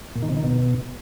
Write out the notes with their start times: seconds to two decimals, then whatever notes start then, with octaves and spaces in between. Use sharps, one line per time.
0.16 A#2
0.23 D#3
0.30 C3
0.37 D#3
0.44 B2